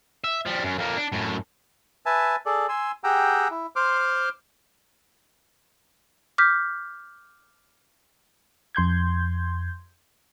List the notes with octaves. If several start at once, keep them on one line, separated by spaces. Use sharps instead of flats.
E5
F3 G3
F#2
F2 A#3
D4
F#2 A2
B4 E5 G#5 A5
G#4 A4 D5
G#5 C6 E6
G4 G#4 F#5 G5 A#5 E6
E4
C5 C6 D6 F6
D6 F6 G6 B6
F2 C6 G6 G#6